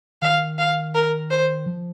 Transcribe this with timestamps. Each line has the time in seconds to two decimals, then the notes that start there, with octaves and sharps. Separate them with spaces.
0.22 D#3 F5
0.59 F5
0.95 A#4
1.31 C5
1.66 F3